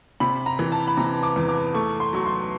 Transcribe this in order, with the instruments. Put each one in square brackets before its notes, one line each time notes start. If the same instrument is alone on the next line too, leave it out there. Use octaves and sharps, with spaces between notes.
[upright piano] C3 B5
A#5
E3
A5
B5
C3 A#5
D6
E2
D6
A3 C#6
C6
F#3 C#6
C6